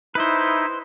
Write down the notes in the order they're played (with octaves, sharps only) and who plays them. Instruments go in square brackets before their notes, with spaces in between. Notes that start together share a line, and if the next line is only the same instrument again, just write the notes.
[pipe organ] D#4 E4 [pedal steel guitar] B4 C5